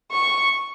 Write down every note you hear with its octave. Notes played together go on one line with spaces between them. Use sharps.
C#6